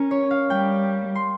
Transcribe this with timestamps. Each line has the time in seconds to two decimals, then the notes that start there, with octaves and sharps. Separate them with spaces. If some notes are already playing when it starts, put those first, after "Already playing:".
Already playing: C#4 A#4
0.11 C#5
0.31 F5
0.50 G3 G5
1.15 C6